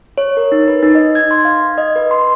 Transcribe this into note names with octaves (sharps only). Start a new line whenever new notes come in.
C#5
A#4
D#4
B4
D#4
D#5
G#6
C6
F5
D#5
B4
C6